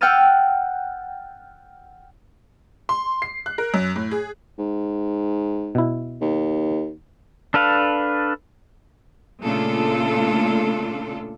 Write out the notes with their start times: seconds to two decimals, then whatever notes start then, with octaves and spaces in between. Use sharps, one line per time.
0.01 F#5 G5 E6 F6 A6 D#7
2.89 C6
3.22 C7
3.46 F#6
3.58 A#4
3.74 F#2
3.96 A2
4.11 G#4
4.58 G#2
5.75 B2 E4
6.21 D#2
7.54 D4 A4 B4 F5
9.42 A#2 C#3 A3 D4 F4 A4